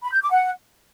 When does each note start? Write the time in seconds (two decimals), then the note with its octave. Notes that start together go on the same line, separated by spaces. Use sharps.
0.04 B5
0.13 G6
0.22 D6
0.31 F#5